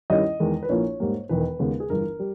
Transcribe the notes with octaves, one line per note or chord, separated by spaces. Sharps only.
G2 D#3 G3 C#4 E4 D#5
E2 D#3 G#3
B4
A#1 A#2 A#3 E4 C#5
G#2 G3 A#3
E1 E2 D#3 B4
D#2 C#3 G#3 B3
G#4
G1 G2 E3 A#4
G3